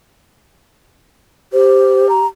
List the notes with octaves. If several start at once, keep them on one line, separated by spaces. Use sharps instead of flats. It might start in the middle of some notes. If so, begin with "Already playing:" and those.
G4 C5
A#5